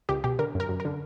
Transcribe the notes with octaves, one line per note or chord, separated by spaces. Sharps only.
C#2 G4
B2 G4
D3 A#4
F#2 A#4
F#2
A#4
D3